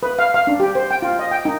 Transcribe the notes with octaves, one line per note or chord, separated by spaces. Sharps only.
B4
F5
F5
D4
G4
C5
G5
F4
D#5
G5
D#4